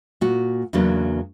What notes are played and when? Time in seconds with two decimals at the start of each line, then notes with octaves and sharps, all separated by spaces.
0.21 A#2 F#4
0.73 E2 C#3 F#3 A#3 B3 D4